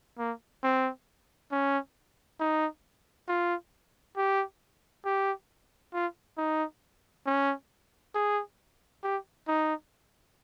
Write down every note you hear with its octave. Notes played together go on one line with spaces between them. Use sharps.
A#3
C4
C#4
D#4
F4
G4
G4
F4
D#4
C#4
G#4
G4
D#4